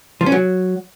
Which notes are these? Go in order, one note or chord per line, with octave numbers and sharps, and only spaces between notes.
F3
C#4
F#3